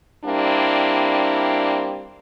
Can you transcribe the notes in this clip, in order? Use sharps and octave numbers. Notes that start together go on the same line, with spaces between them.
G3 A#3 C4 D4 E4